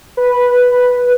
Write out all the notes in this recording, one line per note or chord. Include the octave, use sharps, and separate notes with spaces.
B4